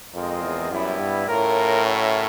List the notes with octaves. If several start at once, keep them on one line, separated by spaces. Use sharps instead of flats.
F2 G#3 C4 F4 A#4 D#5
E2
F#2 G3 B3 E4
G2
A2 C#4 F4 A#4
C#4 F#4 A#4 C#5 E5